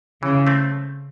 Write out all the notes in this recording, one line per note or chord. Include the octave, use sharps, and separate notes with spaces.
C#3 E3
A3 C4